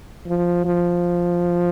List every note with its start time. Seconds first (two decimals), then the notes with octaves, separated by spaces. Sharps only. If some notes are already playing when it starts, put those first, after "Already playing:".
0.27 F3
0.65 F3